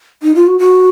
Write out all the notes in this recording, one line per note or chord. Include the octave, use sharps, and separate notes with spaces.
D#4
F4
F#4
F#4